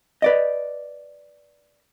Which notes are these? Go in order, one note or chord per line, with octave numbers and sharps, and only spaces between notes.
B4 D5 D#5